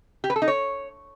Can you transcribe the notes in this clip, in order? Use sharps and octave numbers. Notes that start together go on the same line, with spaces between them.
G4
B4
A4
D#4
C#5